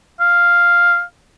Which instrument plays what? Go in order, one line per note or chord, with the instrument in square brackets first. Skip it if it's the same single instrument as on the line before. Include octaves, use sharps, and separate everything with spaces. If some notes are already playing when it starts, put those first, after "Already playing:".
[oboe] F5